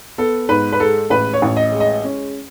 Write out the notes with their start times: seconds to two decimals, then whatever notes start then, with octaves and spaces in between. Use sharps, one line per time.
0.18 B3 A4
0.49 G#2 B4
0.72 B4
0.79 G#3 A4
1.10 A1 B4
1.33 C#5
1.42 A1
1.57 D#5
1.72 G#3
1.80 D#5
2.04 C#4